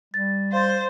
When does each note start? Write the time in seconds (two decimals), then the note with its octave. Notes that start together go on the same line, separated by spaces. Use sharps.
0.14 G3 A6
0.52 C5 F5 C6 A6